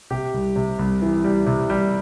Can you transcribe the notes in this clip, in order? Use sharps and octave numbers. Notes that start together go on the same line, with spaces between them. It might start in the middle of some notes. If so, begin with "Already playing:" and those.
C3 G4
C2
C3
C2
E3
G3
C3
G3